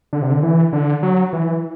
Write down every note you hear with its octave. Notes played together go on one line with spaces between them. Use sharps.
D3
C3
D3
E3
D3
F#3
E3